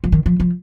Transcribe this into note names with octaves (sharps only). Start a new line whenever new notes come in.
F3
D#3
F3
F3